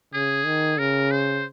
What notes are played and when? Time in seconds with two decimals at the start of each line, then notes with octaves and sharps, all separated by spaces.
0.14 C#3 G#4
0.45 D#3
0.79 C#3 A#4
1.11 C5